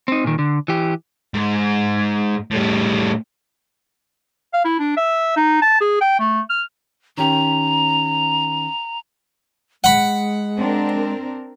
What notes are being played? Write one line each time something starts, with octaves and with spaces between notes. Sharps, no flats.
C4 D#4
A#2 D#3
D3
E3 G4
G#2
A2 G3
F5
E4
D4
E5
D#4
A5
G#4
G5
A3
F6
D#3 C#4 G4 A#5
G#3 F#5 B5
C4 D4 A#4